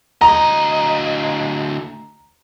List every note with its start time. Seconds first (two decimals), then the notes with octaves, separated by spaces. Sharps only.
0.21 D2 D#5 A#5